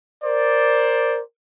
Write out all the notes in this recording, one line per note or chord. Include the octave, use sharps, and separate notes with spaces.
A#4 C5 D5